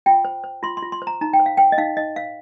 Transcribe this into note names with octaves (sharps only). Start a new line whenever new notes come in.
F4 G5
C5
C5
F4 C6
C6
F4
C6
C5
A#5
D#4 A#5
G5
C5
F5
C5 G5
D#5
D#4 F5
D#4 D#5
C5 F5